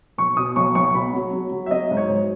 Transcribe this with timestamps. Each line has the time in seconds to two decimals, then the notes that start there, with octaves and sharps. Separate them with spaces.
0.18 B1 C#6
0.37 B2 D#6
0.56 B1 C#6
0.75 B1 C#6
0.95 B1 B5
1.14 F#3
1.33 F#3
1.52 F#3
1.66 E5
1.71 F#3 D#5
1.91 G#2
1.97 C#5
2.09 G#2